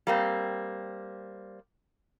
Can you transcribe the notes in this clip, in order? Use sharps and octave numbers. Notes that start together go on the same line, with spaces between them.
G3 A#3 C4